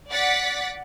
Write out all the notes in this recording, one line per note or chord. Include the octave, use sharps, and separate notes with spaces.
D5 F#5 D6 A6 B6